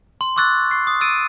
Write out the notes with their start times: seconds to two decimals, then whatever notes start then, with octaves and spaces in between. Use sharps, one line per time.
0.21 C6
0.36 C#6 D6 E6 F#6 A6
0.71 C#6 C7
0.87 D#6
1.01 E6 A6 D7 D#7